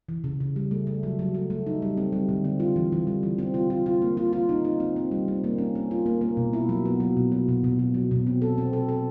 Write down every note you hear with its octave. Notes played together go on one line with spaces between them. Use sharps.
E3
C#3
C#3
G3
A3
A3
F#3
F#3
A3
A3
D#4
G3
C4
G3
D3
C4
F4
E3
E3
G3
E3
C4
F4
F4
F4
A#3
F4
F4
D#4
D#4
C4
C4
G3
C4
A#3
C#4
C#4
F4
A#3
A#3
B2
E4
F#3
B3
F#3
B2
F#3
B2
B2
B2
F#3
B2
C4
A4
C4
A4
A4